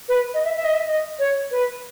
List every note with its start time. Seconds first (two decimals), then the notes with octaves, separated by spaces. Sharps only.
0.09 B4
0.34 D#5
0.45 E5
0.56 E5
0.64 D#5
0.74 E5
0.87 D#5
1.19 C#5
1.51 B4